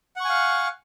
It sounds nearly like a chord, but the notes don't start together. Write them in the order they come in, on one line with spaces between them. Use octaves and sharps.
F#5 C#6 G#5 F5